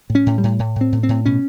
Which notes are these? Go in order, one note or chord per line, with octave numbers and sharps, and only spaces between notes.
A2
C#4
A2
G3
A2
A2
A2
C4
A2
C4
A2
B2 C#4